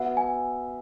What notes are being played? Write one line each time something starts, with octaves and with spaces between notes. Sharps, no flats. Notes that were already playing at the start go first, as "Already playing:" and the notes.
Already playing: B3 F#4 B4 E5 F#5
G#5